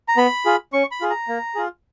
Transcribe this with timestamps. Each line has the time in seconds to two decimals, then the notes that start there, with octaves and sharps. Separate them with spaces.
0.08 A#5
0.17 B3 B5
0.46 F4 G#4
0.73 C#4 C#6
0.91 B5
1.01 F4 G#4
1.10 A#5
1.28 A#3
1.55 F4 G#4